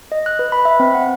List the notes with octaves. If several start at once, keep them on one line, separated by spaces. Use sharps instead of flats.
D#5
F#6
B4
B5
E5
C4
F#5